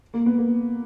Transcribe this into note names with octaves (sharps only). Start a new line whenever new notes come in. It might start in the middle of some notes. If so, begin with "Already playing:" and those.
A#3
B3
A#3